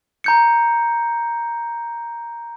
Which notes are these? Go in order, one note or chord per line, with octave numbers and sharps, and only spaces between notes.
A#5 G6 C#7